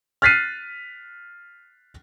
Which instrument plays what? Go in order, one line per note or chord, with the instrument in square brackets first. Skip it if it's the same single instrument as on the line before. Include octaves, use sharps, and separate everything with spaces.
[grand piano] F6 F#6 A6 B6 C7 D#7